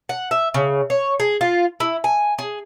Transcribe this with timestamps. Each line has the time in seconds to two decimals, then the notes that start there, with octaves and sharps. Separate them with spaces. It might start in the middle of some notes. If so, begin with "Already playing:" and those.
0.09 F#5
0.31 E5
0.54 C#3
0.90 C#5
1.20 G#4
1.41 F4
1.80 E4
2.04 G#5
2.39 G#4